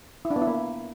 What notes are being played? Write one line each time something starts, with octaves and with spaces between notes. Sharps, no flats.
E4
D4
B3
E4
A#3